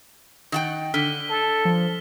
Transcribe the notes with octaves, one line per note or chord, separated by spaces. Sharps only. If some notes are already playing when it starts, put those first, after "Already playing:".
D#3 F#5 G5 A#6
D3 F6 B6 G7
A4
F3